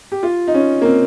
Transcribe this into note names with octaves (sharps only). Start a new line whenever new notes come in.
G4
F4
D#4
C#4
A#3
C4